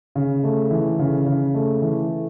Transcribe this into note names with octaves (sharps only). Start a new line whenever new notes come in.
C#3
A3
E3
C#3
C#3
A3
E3